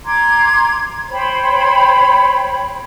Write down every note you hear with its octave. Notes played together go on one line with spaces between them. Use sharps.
A#5 C6 D6 G#6
C5 C#5 G5 B5